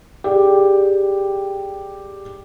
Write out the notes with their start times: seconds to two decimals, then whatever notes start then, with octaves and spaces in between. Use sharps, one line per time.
0.24 G4 G#4 D5